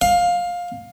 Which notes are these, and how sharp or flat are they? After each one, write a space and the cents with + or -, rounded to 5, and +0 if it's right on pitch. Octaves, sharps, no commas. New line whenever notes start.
F5 +15